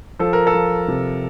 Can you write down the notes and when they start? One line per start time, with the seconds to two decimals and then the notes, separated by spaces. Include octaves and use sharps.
0.19 F3 A4
0.33 A#4
0.47 A4
0.54 F3
0.88 C3